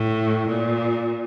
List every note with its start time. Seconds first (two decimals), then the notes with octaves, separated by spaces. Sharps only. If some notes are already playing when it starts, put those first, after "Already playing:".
Already playing: A2
0.48 A#2